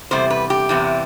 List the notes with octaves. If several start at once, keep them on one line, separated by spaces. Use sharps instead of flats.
E2 C3 G3 C5
B4
G4
E2 C3 E3 G3